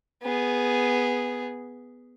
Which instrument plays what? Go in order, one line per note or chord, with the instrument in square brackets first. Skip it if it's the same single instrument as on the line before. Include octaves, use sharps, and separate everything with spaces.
[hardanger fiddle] B3 G#4